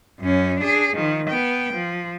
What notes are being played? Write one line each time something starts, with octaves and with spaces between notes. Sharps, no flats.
F#2 C#4
D4 G#4
D#3 F3
B3 G5
F3